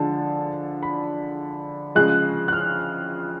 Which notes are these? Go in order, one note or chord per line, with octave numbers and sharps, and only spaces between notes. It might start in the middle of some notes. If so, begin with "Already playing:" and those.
Already playing: D3 F3 G#3 D4 A5
B5
C#3 F3 G#3 F#6
F#6
F6